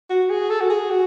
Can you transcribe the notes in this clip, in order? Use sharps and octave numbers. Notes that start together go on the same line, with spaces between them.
F#4
G#4
A4
F#4
G#4
F#4